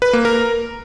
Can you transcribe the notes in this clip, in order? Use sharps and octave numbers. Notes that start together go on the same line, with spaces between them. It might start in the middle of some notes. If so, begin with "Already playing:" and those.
B4
A#3
A#4